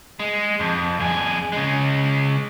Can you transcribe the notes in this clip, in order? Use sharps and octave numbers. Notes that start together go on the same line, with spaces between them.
G#3
F2
F2 G#4
C#3 G#3